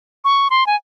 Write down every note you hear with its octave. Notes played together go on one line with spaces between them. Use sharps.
C#6
C6
G#5